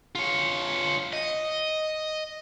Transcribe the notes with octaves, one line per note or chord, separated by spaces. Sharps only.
F4 C#5
D#5